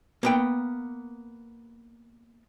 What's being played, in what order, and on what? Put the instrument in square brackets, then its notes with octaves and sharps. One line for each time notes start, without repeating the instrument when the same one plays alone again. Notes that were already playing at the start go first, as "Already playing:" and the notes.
[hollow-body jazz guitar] A#3 B3 G5